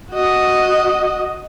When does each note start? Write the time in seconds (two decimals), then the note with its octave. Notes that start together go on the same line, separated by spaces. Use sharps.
0.12 F#4 D#5